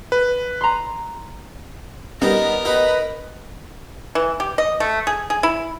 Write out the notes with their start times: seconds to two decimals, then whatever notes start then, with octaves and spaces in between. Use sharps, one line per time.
0.12 B4
0.61 A#5 C6
2.22 G3 B3 D#4 A#4
2.65 D#4 B4
4.15 E3
4.40 G4
4.58 D#5
4.80 A3
5.07 G#4
5.30 G#4
5.43 E4